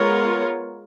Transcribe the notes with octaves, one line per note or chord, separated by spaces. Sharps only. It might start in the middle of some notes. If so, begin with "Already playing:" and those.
Already playing: G#3 B3 F4 A#4 C#5